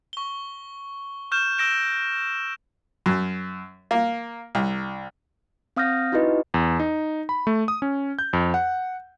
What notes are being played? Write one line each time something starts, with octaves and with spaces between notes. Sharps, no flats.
C#6 G7
C#6 F6 G6 E7
E6 G6 A#6 D7 E7
F#2
A#3
C2
C4 F5 D#6 F6 G6 A#6
D#4 E4 F#4 G4 B4 D#5
E2
D#4
B5
A3
D#6
C#4
G6
F2
F#5